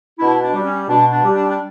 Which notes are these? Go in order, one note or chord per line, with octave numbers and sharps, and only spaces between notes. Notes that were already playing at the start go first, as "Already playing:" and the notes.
B2 D4 E4
D4
G3
C#4
B2 D4
D4
G3
D4
D4